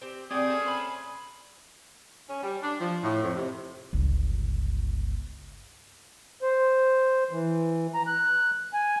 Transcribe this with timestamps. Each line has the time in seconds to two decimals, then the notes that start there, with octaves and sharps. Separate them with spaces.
0.02 C4 G4
0.31 C4 G4 G#4 D5 G5
0.50 A3 C#4
0.66 C5 B5
2.29 C#4
2.43 G3
2.63 D4
2.80 F3
3.03 A2
3.24 F2
3.36 C3
3.93 G1 C#2
6.42 C5
7.31 E3
7.94 A#5
8.07 F#6
8.73 G#5